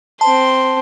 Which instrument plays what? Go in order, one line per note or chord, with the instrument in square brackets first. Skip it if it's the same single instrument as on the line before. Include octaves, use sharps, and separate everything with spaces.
[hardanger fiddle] C4 C6 [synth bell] A5